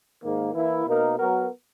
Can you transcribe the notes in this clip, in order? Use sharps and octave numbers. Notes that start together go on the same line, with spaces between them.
G#2 D#3 A#3
E3 A#3 E4
B2 A#3 D#4 A#4
F#3 B3 F#4 A#4